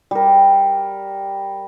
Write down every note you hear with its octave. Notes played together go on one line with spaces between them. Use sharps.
G3 A#4